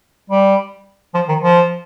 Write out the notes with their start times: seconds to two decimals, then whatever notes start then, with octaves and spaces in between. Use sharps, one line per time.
0.30 G3
1.14 F3
1.28 D#3
1.43 F3